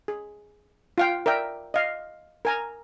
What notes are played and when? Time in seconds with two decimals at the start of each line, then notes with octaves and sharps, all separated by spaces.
0.08 G#4
0.98 F4 F5 G5
1.26 A#4 D5 E5 G5
1.74 D#5 F5
2.45 A#4 G#5 A#5